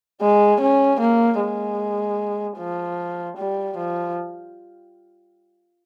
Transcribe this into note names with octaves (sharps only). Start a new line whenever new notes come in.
G#3
C#4
A#3
G#3
F3
G3
F3